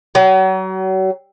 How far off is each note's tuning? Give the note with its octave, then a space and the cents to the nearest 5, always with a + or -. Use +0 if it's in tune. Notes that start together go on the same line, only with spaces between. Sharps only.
F#3 +35